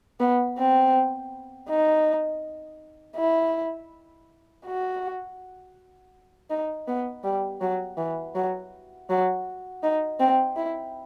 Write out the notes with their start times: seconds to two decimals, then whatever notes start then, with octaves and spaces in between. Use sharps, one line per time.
0.20 B3
0.58 C4
1.69 D#4
3.16 E4
4.65 F#4
6.50 D#4
6.87 B3
7.24 G3
7.61 F#3
7.97 E3
8.35 F#3
9.09 F#3
9.83 D#4
10.20 C4
10.57 E4